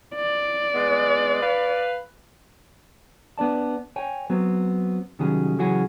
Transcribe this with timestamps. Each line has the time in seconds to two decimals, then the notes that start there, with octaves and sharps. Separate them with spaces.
0.16 D5
0.75 G#3 B3
1.42 B4 F5
3.38 B3 D4 D5 A5
3.96 C#5 G5 G#5
4.30 F#3 B3 C4
5.19 C2 D#3 F#3 C#4 F#4 G#4
5.59 C#3 E3 F#3 C#4 F#4 G#4